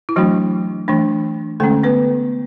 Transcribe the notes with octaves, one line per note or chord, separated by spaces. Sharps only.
E4
E3 F#3 A3 D4 F#4
E3 A3 D4
D3 G#3 A3 C#4 A4
B3 B4